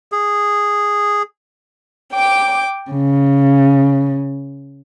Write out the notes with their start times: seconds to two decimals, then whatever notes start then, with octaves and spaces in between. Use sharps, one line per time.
0.12 G#4
2.12 G5 D6
2.90 C#3